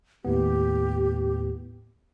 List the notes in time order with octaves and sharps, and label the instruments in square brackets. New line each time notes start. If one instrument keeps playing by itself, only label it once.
[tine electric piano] D#2 A2 B3 [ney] G4